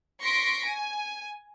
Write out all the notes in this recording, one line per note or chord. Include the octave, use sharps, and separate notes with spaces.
C6 C#6 A#6 B6 D7
G#5